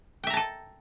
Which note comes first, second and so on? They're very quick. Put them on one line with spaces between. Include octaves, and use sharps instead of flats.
G5 E5 A#5 A5 A4